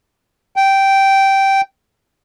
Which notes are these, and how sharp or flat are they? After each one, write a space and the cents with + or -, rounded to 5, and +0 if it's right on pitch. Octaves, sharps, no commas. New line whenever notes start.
G5 -10